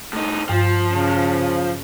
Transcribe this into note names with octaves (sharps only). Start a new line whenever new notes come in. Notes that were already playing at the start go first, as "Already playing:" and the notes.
A2 D#4
G2 F3
C#3